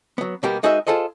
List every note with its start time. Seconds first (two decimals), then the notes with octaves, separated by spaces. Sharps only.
0.18 F#3 B3
0.43 B2 G3 A#3 B3 G4
0.63 G#3 D#4 F#4 G#4 A#4 E5
0.87 F4 G#4 A4 C5 D#5